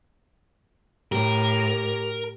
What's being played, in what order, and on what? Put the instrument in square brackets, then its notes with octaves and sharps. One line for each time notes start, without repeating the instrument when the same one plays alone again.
[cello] A2 [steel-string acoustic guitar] G4 [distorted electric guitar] A#4